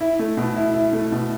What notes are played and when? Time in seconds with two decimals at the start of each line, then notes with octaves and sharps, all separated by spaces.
0.01 E4
0.19 A3
0.37 B2
0.56 E4
0.74 E4
0.93 A3
1.12 B2